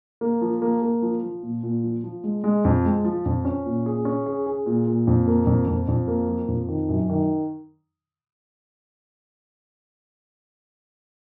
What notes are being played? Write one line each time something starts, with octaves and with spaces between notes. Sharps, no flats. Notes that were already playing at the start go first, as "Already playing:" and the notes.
A#3
F3
A#3
A#3
F3
F3
A#2
A#2
F3
F3
G#3
G#3
F2
G#3
F3
F2
C#4
A#2
G#4
C#4
G#4
G#4
A#2
A#2
F2
A#3
F2
F2
F2
A#3
F3
F2
D#3
F#2
D#3